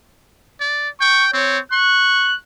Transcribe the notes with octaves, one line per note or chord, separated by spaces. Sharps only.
D5
G5 C#6
C4 C#5
C#6 F#6